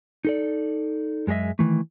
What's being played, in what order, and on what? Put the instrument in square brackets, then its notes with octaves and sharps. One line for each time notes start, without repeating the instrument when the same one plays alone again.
[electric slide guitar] D#4 A4 D5
F#2 G#3 G#4 D#5 E5
D#3 E3 A3